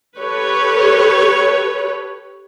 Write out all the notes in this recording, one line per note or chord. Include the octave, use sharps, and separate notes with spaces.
G4 A4 B4 C#5